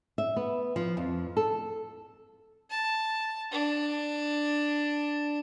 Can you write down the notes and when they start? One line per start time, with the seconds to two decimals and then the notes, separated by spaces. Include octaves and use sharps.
0.18 E5
0.36 B3
0.76 F3
0.97 F2
1.37 A4
2.70 A5
3.52 D4